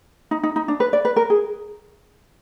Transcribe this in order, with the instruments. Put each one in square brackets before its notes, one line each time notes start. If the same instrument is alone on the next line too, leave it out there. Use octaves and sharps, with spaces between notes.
[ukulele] D#4
D#4
D#4
D4
B4
D5
B4
A#4
G#4